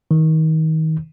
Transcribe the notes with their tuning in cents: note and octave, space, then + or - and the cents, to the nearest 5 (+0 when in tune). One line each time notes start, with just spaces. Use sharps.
D#3 +30